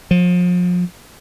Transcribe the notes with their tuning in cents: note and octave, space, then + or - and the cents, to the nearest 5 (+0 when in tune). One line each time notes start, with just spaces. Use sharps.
F3 +35